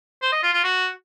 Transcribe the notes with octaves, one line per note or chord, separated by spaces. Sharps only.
C5
D#5
F4
F4
F#4